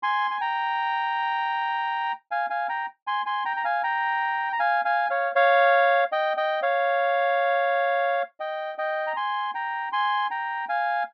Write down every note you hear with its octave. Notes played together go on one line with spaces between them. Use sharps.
G#5 C6
G#5
G5 A#5
F5 G#5
F5 G#5
G5 A#5
G#5 C6
G#5 C6
G5 A#5
A#5
F5 G#5
G5 A#5
A#5
F5 G#5
F5 G#5
C#5 F5
C#5 F5
D#5 G5
D#5 G5
C#5 F5
D#5 G5
D#5 G5
A#5
G#5 C6
G5 A#5
G#5 C6
G5 A#5
F5 G#5